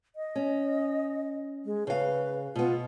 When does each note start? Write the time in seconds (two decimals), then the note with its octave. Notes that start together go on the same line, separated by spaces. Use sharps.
0.16 D#5
0.36 C#4
1.65 G#3
1.87 C#3 B4 F5
2.55 B2 B3 F4